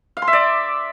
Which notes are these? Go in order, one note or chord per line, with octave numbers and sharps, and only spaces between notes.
F5
C6
E5
D5